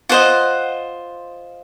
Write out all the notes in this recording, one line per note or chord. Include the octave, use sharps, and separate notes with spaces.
F4 C5 D#5 F#5